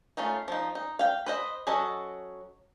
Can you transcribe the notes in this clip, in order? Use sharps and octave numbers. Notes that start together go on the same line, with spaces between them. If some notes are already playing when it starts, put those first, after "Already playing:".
A3 C#4 D#4 F4
F3 D#4
D#4
F5 G5
B4 C5 D#5
F#3 C#4 F#4 A4 D#5